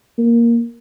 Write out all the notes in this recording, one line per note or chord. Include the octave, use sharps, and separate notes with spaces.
A#3